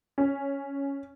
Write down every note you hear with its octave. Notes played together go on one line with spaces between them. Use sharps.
C#4